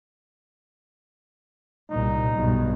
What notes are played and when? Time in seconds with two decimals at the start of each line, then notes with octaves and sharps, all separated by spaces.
1.90 C2 A#2 D#4
2.35 B1 G2